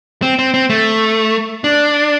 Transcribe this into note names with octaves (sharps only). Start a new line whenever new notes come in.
C4
C4
C4
A3
D4